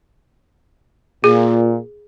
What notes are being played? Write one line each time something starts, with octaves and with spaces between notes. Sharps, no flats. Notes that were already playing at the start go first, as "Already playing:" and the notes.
A#2 G#4